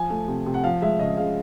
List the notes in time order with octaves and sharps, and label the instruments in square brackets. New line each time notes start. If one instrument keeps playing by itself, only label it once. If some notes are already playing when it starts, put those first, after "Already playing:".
Already playing: [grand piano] F3 G#5
A3
C3
C3
F#5
F3 F5
G#3 E5
C#3 D#5
C#3 F5